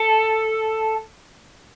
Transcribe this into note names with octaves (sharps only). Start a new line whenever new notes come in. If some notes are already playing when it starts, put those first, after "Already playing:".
Already playing: A4